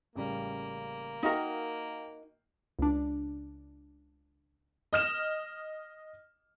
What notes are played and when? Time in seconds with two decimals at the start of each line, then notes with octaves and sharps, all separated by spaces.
0.16 A1 C#3 G3 A#3
1.23 D#4 F#4 A#4 D#5 F5 G5
2.79 C#2 D4
4.93 D#5 F6 E7